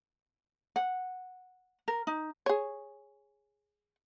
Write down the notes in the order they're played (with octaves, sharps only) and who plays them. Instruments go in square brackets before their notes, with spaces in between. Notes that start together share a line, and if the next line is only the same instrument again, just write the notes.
[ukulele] F#5
A#4
D#4
[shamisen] G#4 C#5